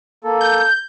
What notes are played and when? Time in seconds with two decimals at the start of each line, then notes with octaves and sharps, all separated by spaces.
0.24 A#3 A4
0.41 G6